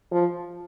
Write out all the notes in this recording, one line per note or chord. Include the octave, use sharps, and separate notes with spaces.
F3